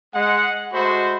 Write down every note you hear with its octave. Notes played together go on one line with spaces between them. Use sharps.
G#3 F#5
G#3 A3 F#4 C5 B5